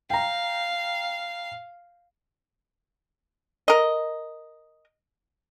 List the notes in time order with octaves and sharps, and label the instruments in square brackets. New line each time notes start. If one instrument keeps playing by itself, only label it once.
[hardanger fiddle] F5 [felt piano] G5 A#5
[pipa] A#4 D#5